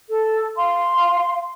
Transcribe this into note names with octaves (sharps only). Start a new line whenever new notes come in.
A4
F5 C6